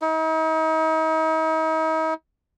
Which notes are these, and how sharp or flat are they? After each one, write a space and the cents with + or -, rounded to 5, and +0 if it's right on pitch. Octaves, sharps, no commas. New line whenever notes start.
D#4 +40